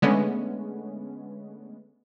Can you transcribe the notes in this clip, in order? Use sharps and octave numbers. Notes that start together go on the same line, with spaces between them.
D3 G#3 A3 B3 C#4